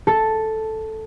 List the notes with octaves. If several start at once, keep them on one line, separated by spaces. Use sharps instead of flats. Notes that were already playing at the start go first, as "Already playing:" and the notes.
A4